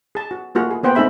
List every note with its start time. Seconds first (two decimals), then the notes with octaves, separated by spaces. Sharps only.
0.15 G#4 A5
0.31 F#4
0.55 A3 A#3 F4 F#4 G#4
0.71 G#4
0.83 A#3 B3 C5 F#5 G5
0.95 A3 C4 D#4 G#4 E5 B5